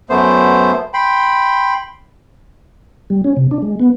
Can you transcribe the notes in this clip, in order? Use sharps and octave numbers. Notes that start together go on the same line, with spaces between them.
F#2 A3 B3 C5
G5 B5 C6
G3
C#4
C3
D4
G#3
B3